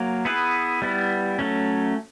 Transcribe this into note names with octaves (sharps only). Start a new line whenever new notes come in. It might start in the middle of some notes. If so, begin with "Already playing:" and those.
Already playing: F#3 A#3
B3 E4 G#4 B4
G3 B3 E4
F#3 A3 C#4